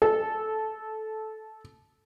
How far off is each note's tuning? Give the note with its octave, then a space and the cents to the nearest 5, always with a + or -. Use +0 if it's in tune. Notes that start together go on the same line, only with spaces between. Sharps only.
A4 -15